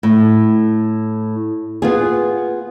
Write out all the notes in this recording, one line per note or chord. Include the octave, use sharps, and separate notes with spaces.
A2
B3 F4 G#4